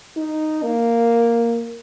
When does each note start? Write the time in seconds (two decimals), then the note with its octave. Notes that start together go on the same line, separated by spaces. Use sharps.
0.16 D#4
0.63 A#3